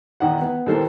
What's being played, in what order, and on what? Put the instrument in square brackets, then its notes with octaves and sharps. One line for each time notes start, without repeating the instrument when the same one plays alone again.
[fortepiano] E2 D#3 E4 F#5
B3
D#2 E3 G3 A4 A#4 C5